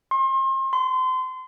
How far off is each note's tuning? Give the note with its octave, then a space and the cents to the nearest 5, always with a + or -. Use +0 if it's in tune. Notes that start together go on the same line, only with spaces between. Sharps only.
C6 +35
C6 -30